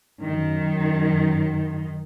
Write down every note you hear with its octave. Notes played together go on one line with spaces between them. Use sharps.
F#2 D#3